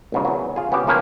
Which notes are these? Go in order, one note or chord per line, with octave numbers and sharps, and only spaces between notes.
A#1 G#2 C#3
E2 F#3
F4 G#4
B3 C#4 F#4 G4
F3 A#3 C#4 B4